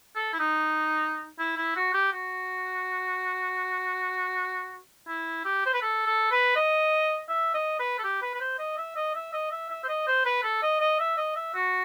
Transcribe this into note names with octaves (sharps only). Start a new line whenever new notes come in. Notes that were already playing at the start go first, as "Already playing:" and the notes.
A4
E4
D#4
E4
E4
F#4
G4
F#4
E4
G4
C5
B4
A4
A4
B4
D#5
E5
D#5
B4
A4
G4
B4
B4
C5
D#5
E5
D#5
E5
D#5
E5
E5
C5
D#5
C5
B4
A4
D#5
D#5
E5
D#5
E5
F#4